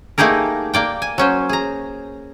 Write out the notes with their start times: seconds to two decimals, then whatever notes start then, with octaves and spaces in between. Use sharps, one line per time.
0.18 A3 A#3 D#4 G4 G#4 A#4
0.74 A#3 D5 G5
1.02 G#5
1.18 F#3 C#4 C5
1.49 G#4 A#5